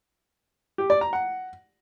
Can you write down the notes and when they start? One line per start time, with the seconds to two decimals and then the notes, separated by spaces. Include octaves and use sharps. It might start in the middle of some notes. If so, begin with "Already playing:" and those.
0.78 G4
0.90 D5
1.01 A#5
1.13 F#5